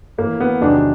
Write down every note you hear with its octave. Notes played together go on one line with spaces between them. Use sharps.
A2 E3 A#3
B3
E2 C3 D#3 F#3 D4